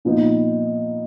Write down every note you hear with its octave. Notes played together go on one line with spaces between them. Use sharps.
A#2 F3 B3 D#4